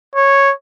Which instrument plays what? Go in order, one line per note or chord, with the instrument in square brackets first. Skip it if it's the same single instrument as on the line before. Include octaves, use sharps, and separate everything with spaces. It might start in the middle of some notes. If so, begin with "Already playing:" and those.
[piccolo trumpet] C#5